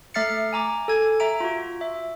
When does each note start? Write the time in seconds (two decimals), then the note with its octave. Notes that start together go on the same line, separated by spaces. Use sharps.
0.14 A3 E5 F6 A6 C7 C#7
0.53 G#5 A#5 D6
0.88 A4 G#5 G#6
1.20 E5 A#5 D7
1.40 F4 F#4
1.81 E5